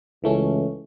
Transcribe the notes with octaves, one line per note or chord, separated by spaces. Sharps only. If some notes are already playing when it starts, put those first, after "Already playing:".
C#2 E3 A3 C#4